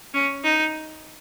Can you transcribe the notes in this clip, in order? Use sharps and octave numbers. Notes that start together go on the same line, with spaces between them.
C#4
D#4